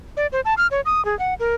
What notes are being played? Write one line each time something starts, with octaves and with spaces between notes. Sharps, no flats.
D5
C5
A5
F6
C#5
D#6
G#4
F#5
A#4